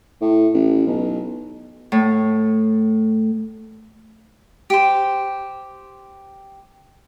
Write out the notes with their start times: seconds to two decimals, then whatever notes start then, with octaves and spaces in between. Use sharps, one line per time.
0.22 A2
0.54 A1
0.87 B1
1.92 A2
4.70 G4 C5